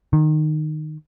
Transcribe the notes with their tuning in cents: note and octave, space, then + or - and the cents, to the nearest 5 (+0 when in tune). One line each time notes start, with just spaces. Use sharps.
D#3 -15